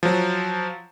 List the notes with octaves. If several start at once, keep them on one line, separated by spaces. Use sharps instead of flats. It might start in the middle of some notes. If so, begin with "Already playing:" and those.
F3 F#3